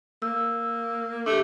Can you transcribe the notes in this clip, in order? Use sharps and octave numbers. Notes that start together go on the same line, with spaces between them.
A#3 E6
A3 D4 G4